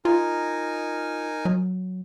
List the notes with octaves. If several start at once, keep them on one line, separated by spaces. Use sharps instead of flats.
D#4 F4 A#4 G#5
F#3